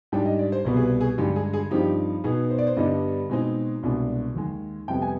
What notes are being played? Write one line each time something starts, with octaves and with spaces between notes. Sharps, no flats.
G#2 G3 D4 G5
D#5
D5
C5
C2 B2 G3 B3 B4
G#4
B4
G#4
G2 D3 G#3 G4
G#4
G#4
G2 F3 C4 D#4 G4
B2 B3 D#4 G#4
C5
D5
C5
G2 D3 G3 B3 D4 D#5
B2 G#3 C4 D#4
C2 B2 G#3 D4
D#2 D#3 G#3
F2 C3 G3 B3 G5
G#5